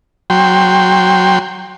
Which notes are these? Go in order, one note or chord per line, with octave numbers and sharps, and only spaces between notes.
F#3 G5 C6